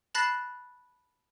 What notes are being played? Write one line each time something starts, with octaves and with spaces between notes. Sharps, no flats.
A5 B5 F#6 A6 A#6 C7